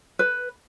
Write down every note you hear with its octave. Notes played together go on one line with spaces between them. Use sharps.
B4